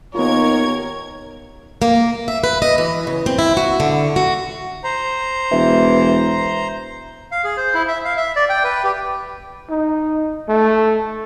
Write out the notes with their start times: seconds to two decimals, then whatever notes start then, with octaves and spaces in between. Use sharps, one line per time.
0.15 D#2 B3 F4 A#4 C#5 G#6
1.82 A#3
2.28 E5
2.44 B4
2.62 D#5
2.78 E3
3.07 C#3
3.26 C4
3.39 E4
3.57 F#4
3.80 D3
4.16 F#4
4.84 C5 A#5
5.51 E1 E3
7.31 F5
7.44 G#4
7.57 C5
7.74 E4
7.88 E5
8.05 F5
8.17 E5
8.36 D5
8.49 G5
8.64 B4
8.84 G4
9.70 D#4
10.49 A3